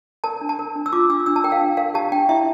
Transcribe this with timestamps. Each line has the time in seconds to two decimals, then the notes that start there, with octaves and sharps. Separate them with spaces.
0.24 A#4 A5
0.41 D4
0.49 A5
0.59 A#4
0.76 D4
0.86 E6
0.93 F4 D6
1.10 D4 E6
1.26 D4 E6
1.36 A5
1.44 A#4 G5
1.52 F5
1.61 D4
1.77 A#4 F5
1.94 G4 A5
2.12 D4 G5
2.29 E4 E5